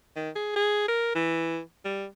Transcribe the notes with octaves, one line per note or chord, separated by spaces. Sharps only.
D#3
G#4
G#4
A#4
E3
G3